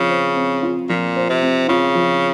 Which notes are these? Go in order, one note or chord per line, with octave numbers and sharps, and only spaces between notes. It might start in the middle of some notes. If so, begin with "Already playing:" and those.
Already playing: C#3 F3 C4
C5
C4
F4
A#2 F3
C5
C3
C4
C#3 F4
F3